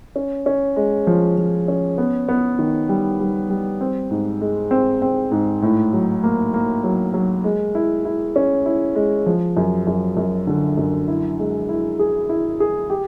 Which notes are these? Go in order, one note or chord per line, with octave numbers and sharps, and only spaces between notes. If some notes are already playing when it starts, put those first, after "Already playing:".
C#4
C#4
G#3
F3
F3
C#4
B3
B3
D#3
G3
G3
G3
C4
G#2
G#3
C4
C4
G#2
A2
F#3
A#3
A#3
F#3
F#3
G#3
E4
E4
C#4
E4
G#3
F3
F#2
F#2
F#2
D3
F#2
E4
G#3
E4
G#4
E4
G#4
G4